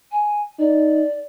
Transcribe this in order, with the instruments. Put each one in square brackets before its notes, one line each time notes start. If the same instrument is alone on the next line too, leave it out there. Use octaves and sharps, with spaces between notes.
[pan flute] G#5
[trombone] D#4 [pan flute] D5